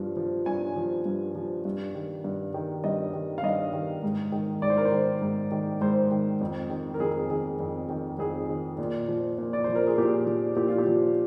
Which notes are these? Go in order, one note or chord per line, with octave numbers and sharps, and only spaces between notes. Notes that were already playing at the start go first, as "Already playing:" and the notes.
Already playing: G2 F3
F3
G2 G#5
F3
G2
F3
G2
D#3
G2
D#3
G2 D#5
D#3
F5
G2 D#5
D#3
G#2
D#3
G#2 D5
C5
A#4
C5
D#3
G#2
D#3
G#2 C5
D#3
F2
D#3
A#4
F2 G#4
D#3 G#4
F2
D#3
F2 G#4
D#3
A#2
F3
A#2
D5
F3 C5
A#4
G#4
A#2 G4
F3
A#2 G4
F4
G4
F3